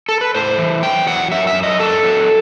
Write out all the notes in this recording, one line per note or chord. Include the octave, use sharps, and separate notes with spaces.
A4
B4
A2 C5
E3
F#3 G5
E2 F#5
F#2 E5
E5
F#2
D#5
F#3 A4
F#3